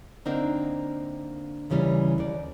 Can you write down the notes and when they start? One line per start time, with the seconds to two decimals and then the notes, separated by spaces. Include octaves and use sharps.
0.25 D3 A#3 C4 D4 D#4
1.70 D#2 C#3 E3 G3 C#4
2.18 D#2 D5